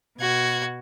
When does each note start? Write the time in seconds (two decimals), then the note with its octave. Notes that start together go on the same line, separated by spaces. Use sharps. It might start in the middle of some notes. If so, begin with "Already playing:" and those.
0.19 B2 F#4 G#6